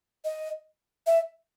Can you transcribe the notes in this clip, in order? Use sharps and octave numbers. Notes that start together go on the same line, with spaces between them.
D#5
E5